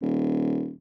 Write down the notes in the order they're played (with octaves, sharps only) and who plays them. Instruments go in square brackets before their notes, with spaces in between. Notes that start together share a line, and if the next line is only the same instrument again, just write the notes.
[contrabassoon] D#1